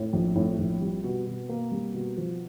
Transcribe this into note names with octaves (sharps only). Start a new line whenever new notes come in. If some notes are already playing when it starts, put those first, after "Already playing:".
Already playing: A2
A#1
A2
A#1
G3
B2
B2
A#3
G3
B2
F3